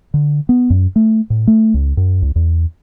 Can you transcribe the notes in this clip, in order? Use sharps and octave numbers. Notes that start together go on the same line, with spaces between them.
D3
B3
F#2
A3
A2
A3
C#2
F#2
C#2
E2